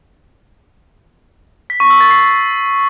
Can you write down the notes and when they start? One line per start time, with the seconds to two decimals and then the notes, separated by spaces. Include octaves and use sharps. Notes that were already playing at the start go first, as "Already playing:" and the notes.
1.70 B6
1.80 C#6
1.90 E6
2.00 A6
2.11 C7